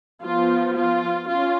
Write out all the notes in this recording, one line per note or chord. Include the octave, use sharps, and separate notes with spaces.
F3 B3 F4
F4
C#4 F4